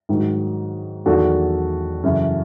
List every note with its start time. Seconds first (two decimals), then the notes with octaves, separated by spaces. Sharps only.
0.09 G#2 D#3 F#3
1.06 E2 D#3 F#3 F#4 A4
2.03 F#2 C#3 E3